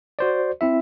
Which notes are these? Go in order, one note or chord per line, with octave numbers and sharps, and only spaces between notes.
F#4 C5 D5
C4 E4 E5